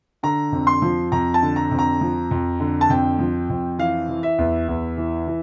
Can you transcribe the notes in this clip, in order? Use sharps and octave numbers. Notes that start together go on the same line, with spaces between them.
D3 A#5
F2
C6
F3
F2 A#5
A5
D3
A#5
F2
A#5
F3
F2
D3
A5
F2 G5
F3
F2
E3 F5
E3
E5
E2
E2
E3
E3